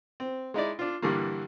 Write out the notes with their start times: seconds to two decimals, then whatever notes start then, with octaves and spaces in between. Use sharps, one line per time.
0.20 C4
0.54 G#3 D#4 E4 D5
0.79 D4 F4
1.02 G2 D3 E3 G3 A#3